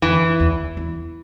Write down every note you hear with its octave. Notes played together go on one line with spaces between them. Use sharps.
F2 E3
E2
E2